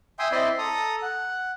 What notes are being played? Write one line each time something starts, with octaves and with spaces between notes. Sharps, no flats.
E5 G5 G#5 C6 D#6
C4 E4 D5 D#5 B5 C6
A4 A#5 D#6
F#5